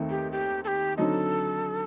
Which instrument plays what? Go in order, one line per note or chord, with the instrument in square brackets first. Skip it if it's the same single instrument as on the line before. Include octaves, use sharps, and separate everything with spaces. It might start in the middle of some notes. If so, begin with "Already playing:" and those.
Already playing: [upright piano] D#2 D#3 A3 C4 D#4
[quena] G4
G4
A4
G4
[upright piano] D3 F#3 C4 D#4 [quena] A4